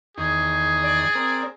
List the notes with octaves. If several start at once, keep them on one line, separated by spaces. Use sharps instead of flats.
E2 D#3 G#4
D5
C4 A#4